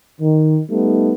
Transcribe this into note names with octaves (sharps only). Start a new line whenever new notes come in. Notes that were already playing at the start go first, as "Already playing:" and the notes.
D#3
G3 A3 B3 D#4